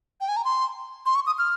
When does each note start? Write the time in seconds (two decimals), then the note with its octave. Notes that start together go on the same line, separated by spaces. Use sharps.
0.21 G5
0.29 G#5
0.37 A#5
0.45 C6
1.06 C6
1.15 C#6
1.27 D#6
1.38 F6